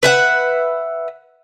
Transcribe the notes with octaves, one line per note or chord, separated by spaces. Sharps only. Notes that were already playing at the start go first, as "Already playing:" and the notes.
B4 E5 F#5